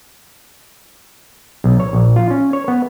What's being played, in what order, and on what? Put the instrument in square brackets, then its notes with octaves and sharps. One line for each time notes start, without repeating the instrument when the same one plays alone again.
[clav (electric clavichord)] B1
C#5
A#1
F4
C#4
C#5
B3